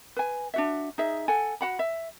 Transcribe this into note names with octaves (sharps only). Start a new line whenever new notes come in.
B4 G#5
D4 F#4 E5
D#4 G#4 E5
A4 F#5 G#5
F#4 F#5 B5
E5